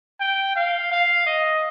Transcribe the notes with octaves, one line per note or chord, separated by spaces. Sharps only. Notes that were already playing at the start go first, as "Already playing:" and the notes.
G5
F5
F5
D#5